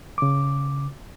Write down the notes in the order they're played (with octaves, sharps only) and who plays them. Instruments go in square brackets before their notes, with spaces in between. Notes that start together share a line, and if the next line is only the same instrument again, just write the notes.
[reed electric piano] C#3 D6